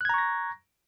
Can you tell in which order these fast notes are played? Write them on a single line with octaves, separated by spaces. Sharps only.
F#6 G#6 A#5 C#6 A#6